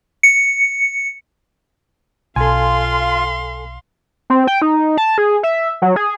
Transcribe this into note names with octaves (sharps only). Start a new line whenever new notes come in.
C#7
B1 F4 A4 F5 G#5 C6
C4
G5
D#4
A5
G#4
E5
F#3
G#4